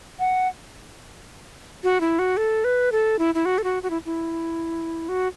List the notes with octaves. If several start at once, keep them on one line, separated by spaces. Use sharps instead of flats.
F#5
F#4
E4
F#4
A4
B4
A4
E4
E4
F#4
A4
F#4
F#4
E4
E4
F#4